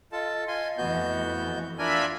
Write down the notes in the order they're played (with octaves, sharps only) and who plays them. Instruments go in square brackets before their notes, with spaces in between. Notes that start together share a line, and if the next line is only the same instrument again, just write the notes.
[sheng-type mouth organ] F4 A4 A5 [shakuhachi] D#5
[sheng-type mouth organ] F4 G#5 C6
[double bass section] F2 E3 A3 [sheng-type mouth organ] B3 F#4 G6
[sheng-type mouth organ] D4 A#4 G#5 [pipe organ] F4 E5 B5